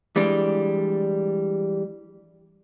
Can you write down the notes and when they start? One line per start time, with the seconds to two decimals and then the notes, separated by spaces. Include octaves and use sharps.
0.16 E3 G3 G#3 D4